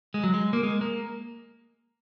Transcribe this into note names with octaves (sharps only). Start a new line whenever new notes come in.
G#3
F#3
G#3
A#3
G#3
A#3